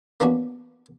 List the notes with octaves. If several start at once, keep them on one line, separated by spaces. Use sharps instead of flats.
A#3 B3 C#4 D4 F#4